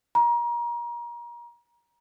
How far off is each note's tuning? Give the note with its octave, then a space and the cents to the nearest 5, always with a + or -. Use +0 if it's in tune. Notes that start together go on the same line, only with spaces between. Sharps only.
A#5 +30